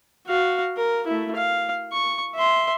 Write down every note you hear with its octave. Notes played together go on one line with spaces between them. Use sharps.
F#4 F5
A#4
A3 E4
F5
C#6
E5 C6